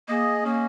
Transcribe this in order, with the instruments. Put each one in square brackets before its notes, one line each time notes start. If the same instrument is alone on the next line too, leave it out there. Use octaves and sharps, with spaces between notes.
[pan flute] A#3 [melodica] G#4 D#5
[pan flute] A#3 [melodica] C#4